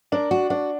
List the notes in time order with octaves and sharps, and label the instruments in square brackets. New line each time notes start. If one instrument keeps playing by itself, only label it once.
[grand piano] D4 [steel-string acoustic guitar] A#4
[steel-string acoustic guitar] F#4
[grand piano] D4 [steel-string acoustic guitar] F#4